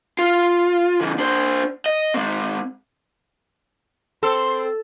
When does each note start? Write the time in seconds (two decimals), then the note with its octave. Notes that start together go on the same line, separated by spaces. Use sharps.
0.19 F4
1.01 C#3 E3
1.18 D4 C5
1.86 D#5
2.14 G#3 C4
4.23 C4 A4 C6